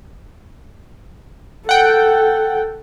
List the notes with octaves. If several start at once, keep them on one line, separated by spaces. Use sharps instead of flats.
A4 F#5 G5